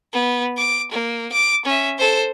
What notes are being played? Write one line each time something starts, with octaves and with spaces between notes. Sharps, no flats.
B3
D6
A#3
D6
C#4 E5
A4 C5